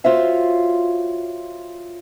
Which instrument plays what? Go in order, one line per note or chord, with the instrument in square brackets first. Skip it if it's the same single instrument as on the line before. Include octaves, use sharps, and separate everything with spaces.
[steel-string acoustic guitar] F4 F#4 C5 C#5 E5 F5